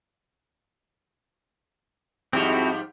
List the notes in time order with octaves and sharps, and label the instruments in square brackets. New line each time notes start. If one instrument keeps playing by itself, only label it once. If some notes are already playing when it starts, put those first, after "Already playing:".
[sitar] G#2 F3 G3 [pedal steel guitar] C4 E4 F#4